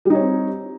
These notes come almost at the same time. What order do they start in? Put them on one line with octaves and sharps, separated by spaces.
G3 D#4 C#5 C4